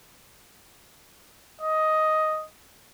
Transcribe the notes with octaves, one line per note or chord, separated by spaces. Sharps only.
D#5